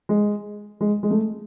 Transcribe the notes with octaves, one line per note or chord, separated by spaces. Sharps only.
G#3
G#3
G#3
A3